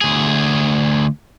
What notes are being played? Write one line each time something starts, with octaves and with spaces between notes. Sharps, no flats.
D2 G#4